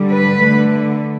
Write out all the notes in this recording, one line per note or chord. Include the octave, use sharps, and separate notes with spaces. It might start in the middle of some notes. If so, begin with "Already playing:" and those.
Already playing: D3 G3
B4
D3 A3